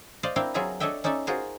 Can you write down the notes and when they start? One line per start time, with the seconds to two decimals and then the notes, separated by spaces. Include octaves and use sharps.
0.23 C5 D5 D#5 F5
0.36 C4 D4 E4 A#4 F5 G5
0.54 F#3 F4 G#4 E5 G#5 A#5
0.80 D4 A4 C#5 D#5 E5 G5
1.04 C#4 D#4 A4 D5 E5
1.27 F4 F#4 G#4 A#4 C5